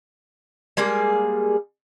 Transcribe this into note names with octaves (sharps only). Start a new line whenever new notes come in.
G3 G#3 A#3 G#4